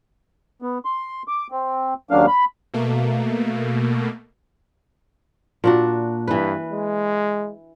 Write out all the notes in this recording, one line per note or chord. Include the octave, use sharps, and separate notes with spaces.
B3
C6
D6
C4
D#2 C#3 F#3 A#3 D4 F5
B5
B2 A3 A#3
A#2 D4 F#4
G2 E3 B4
G#3